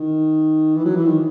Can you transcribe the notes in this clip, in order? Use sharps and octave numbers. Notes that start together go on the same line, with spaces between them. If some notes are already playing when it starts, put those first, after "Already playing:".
Already playing: D#3
E3
F#3
E3
D#3